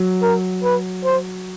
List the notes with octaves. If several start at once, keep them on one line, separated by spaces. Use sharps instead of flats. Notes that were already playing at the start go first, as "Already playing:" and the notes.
Already playing: F#3
A#4
B4
C5